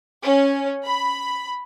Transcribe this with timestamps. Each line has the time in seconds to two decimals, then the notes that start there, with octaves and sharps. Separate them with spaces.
0.23 C#4
0.85 B5